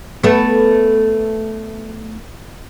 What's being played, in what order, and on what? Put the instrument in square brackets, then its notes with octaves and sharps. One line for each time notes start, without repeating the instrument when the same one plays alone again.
[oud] A3 B3